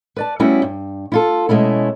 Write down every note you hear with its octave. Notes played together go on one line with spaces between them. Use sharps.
B4 D5 A5
G3 A3 B3 C#4 E4 F#4
G2
E4 F4 A4
B2 G#3 A3 C#4 E4